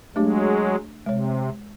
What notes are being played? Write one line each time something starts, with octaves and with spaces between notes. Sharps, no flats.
F#3 G#3 A3 D4 G4
C3 G#3 C#5